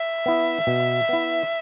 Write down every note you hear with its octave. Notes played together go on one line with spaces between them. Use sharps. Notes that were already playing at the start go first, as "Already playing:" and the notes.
Already playing: E5
B3 E4
B2
B3 E4